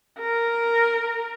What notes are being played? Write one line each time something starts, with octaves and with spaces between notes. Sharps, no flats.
A#4